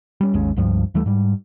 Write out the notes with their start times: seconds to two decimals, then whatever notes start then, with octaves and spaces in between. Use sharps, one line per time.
0.21 G3 C#4
0.34 G#1 D#2 G#3 C#4
0.56 C#2 G2 F3 G3
0.94 D#2 E3 G3 A3
1.06 G#2 G3